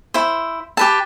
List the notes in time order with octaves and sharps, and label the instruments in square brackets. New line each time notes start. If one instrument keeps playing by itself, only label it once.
[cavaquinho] E4 C5
G4 B4 A5